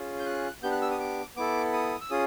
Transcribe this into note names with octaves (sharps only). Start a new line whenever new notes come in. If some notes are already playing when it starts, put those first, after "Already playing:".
Already playing: C#4 F4 G#4
G6
F#6
B3 D4 G4 G6
F#6
E6
D#6
D6
B3 E4 A4 D6
D#6
E6
C#4 F4 G#4 D#6